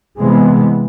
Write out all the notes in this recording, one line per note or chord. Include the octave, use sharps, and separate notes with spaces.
C3 E3 G#3 B3